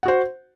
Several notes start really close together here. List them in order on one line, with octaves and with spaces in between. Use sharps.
F#5 F#4 C5